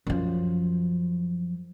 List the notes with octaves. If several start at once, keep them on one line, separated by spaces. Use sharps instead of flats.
F#2 F3